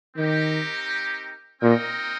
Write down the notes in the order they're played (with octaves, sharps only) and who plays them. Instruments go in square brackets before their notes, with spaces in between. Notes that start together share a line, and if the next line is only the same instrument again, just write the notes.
[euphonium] D#3 [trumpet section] C4 D#4 G4 A#4
[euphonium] A#2 [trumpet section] C4 D#4 A#4 D#5 G5